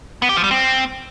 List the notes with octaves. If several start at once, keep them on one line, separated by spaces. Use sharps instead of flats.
B3
G4
F3
G3
C4